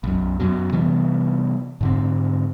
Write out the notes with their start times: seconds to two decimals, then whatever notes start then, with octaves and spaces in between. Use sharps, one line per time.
0.04 B1 F#2
0.40 F#2 B2 F#3
0.72 C3 E3 G3 B3
1.81 G#2 D3 C4